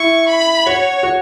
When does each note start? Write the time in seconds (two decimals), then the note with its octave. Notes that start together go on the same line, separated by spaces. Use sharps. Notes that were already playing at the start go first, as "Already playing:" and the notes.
Already playing: E4 C#6
0.29 B5
0.66 F#4 C#5
1.03 F#4